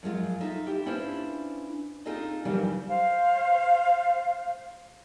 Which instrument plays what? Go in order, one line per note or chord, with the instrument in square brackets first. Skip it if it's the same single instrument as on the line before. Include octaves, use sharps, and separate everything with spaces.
[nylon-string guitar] F#2 F3 G#3 F4
D#4 F4 A4 E5
E4 G4
C#4 D4 E4 F4 B4 C5
C4 D#4 F4 G#4 A4 D#5
F#2 C#3 E3 F3 G3
[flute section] C5 F5